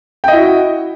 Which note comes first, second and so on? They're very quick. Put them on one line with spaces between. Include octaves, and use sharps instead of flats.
G5 D#5 E4 F#4